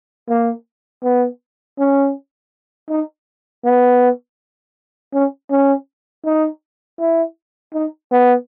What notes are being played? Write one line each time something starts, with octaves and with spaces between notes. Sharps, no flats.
A#3
B3
C#4
D#4
B3
C#4
C#4
D#4
E4
D#4
B3